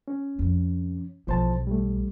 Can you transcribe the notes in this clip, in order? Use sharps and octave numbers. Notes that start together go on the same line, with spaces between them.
C#4
F2 C3
B1 E3 F3 C5 A5
G3 A3